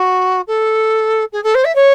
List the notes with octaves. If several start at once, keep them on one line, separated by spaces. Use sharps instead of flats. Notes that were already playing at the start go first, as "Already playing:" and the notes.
Already playing: F#4
A4
G#4
A4
C5
E5
C#5